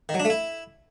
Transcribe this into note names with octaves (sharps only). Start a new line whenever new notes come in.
D#3
F#3
D4
A3
E4